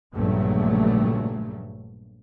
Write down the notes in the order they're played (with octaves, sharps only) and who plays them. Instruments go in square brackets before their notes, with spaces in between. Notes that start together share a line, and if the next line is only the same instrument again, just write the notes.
[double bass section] A#1 G2 C#3 F#3 A3